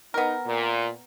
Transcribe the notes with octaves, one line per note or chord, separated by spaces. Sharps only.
B3 D#4 A#4
A#2